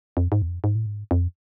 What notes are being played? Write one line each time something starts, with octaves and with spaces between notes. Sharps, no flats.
F2
G#2
E2
F2
G#2
A2
G#2
F2